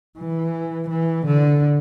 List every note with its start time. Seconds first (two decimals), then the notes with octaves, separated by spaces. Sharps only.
0.18 E3
0.89 E3
1.26 D3